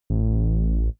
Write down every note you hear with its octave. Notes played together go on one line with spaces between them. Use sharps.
A1